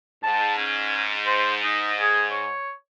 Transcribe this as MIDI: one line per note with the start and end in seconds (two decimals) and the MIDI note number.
0.23 2.51 44
0.23 0.56 81
0.58 1.09 61
1.26 1.53 72
1.63 1.93 63
2.00 2.26 68
2.31 2.72 73